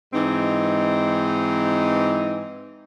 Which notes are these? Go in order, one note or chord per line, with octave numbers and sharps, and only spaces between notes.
G#2 E3 C4 D#4